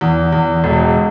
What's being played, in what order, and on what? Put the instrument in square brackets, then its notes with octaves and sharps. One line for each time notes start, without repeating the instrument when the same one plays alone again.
[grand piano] E2
E2
E1